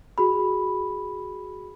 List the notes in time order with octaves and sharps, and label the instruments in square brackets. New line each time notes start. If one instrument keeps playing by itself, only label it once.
[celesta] F#4 G#4 B5